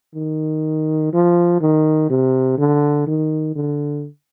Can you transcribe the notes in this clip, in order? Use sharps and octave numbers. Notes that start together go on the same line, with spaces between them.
D#3
F3
D#3
C3
D3
D#3
D3